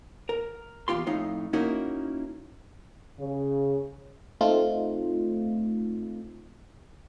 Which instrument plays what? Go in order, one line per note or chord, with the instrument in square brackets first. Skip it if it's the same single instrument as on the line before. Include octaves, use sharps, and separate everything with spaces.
[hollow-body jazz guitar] A#4
E2 A#2 F4 G4 C6
F2 A2 D#4 F5
A#3 C#4 D#4 E4 F#4 A#4
[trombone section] C#3
[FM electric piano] A3 C4 D#4 F4